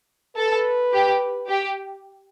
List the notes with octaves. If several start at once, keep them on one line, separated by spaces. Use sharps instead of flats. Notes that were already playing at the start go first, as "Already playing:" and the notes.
A4 B4
G4
G4